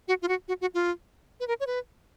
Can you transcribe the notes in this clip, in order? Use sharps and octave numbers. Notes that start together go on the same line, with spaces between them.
F#4
F4
F#4
F#4
F#4
F4
B4
A#4
C#5
B4